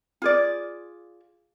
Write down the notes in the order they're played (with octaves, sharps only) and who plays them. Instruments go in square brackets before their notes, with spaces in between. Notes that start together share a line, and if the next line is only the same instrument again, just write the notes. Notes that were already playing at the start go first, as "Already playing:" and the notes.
[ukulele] F4 G#4 D5